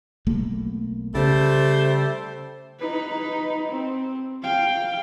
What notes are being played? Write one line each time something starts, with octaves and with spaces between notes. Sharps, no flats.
B1 A3 A#3
C#3 G3 A3 C5
D#4 B4
C4
F5 G5